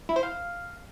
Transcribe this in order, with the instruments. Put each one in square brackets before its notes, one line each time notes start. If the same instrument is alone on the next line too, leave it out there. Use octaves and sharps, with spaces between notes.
[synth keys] E4
C5
F5